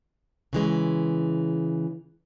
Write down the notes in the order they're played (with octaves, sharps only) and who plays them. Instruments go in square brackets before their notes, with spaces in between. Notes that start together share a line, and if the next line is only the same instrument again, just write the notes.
[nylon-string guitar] C#3 E3 G#3